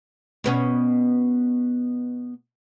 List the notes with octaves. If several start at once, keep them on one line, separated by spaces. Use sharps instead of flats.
B2 B3 C#4